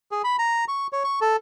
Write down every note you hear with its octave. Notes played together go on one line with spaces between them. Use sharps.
G#4
B5
A#5
C#6
C#5
C#6
A4